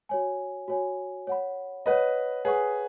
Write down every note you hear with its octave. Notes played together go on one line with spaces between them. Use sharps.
F#4 C#5 G#5
F#4 C#5 G#5
C#5 F#5 B5
B4 C#5 D#5 F#5 B5
G#4 B4 C#5 F#5 C#6